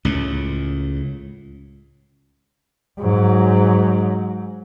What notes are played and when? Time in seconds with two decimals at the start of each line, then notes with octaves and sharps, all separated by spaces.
0.05 C#2 A2
3.00 G#2 F#3